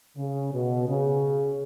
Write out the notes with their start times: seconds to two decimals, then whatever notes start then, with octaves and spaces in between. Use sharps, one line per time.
0.17 C#3
0.53 B2
0.88 C#3